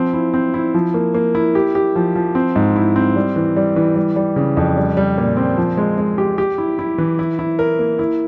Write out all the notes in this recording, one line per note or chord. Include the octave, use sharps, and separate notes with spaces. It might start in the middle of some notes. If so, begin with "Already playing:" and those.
Already playing: F3 C4
E4
C4
E4
F3
A#3
A#3
E4
G4
G4
F3
F3
C4
G#2
E4
C4
G3
E3
G3
E3
G3
G3
C#3
F2
G3
G3
A#2
C4
F3
G#3
G#3
G4
G4
E4
E4
E3
E4
E4
A#4
A#3
E4